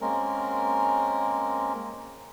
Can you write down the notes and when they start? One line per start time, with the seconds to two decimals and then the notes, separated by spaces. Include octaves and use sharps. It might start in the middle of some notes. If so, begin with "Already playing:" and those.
0.01 G#3 A#3 C4 C#4 A#4